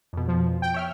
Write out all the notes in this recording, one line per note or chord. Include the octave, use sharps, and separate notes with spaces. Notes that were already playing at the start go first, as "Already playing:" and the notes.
F2 B2
F3
G5
C#5 E5 F6